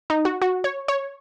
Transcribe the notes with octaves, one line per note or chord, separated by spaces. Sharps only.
D#4
F#4
F#4
C#5
C#5